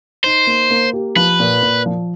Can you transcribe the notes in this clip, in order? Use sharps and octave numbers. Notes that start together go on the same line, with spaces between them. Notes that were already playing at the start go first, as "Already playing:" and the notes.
D#4 C5
A#3
A#3
G4
F3 B4
A#2
A#2
F3